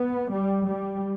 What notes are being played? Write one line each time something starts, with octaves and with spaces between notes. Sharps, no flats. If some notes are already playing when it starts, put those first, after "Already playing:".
Already playing: B3
G3
G3